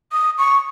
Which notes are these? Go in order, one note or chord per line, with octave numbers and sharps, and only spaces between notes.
D#6
C#6